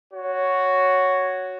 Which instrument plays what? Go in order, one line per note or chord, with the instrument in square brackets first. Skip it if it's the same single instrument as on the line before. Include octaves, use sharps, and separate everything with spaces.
[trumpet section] F#4 C#5